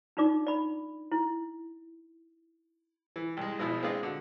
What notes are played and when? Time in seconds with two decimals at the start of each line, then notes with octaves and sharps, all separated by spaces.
0.17 D4 D#4 F4 D5 D6
0.47 D5 B5
1.12 E4
3.16 E3
3.37 C2 G#3
3.59 G#1 B2 F3 E4 G#4
3.83 G#3 B3 C4 D4 F4 G#4
4.03 D3 F#4